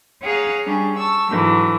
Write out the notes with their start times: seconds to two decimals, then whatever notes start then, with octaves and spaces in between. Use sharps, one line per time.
0.22 G#4 C#5 F5 F#5 A#5
0.65 G3 C#4 D4 G#4
0.95 A5 C#6 E6
1.30 G#2 D3 E3 F#3